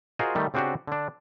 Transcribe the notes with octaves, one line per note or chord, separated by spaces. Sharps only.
F4 F#4 G#4 A#4 C5 D#5
D#3 G3 A3
C#3 C4 D4 F#4 G4 C5
D3 D4